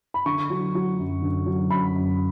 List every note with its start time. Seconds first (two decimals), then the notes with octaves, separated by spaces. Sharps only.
0.14 B5
0.26 D3 C#6
0.50 F#3
0.75 F#3
0.99 F#2
1.22 D3
1.46 F#3
1.70 F#2 B5
1.95 F#2